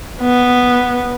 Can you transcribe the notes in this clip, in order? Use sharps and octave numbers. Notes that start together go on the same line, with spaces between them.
B3